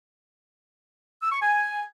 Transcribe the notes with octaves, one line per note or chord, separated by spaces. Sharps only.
E6
C#6
G#5